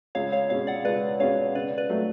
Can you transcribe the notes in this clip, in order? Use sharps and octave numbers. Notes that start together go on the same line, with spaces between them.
C#2 C#5 F5
C#5 F5
B2 G#3 C#4 C#5 F5
D5 F#5
C#2 B4 D5
B2 G#3 C#4 C#5 F5
C#3 B4 D5
B4 D5
F#3 A3